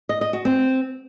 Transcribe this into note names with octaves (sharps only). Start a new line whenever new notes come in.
D#5
D#5
F#4
C4